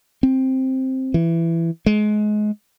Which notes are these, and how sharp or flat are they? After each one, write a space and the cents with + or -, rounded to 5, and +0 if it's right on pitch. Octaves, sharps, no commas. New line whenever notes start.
C4 +5
E3 +15
G#3 +25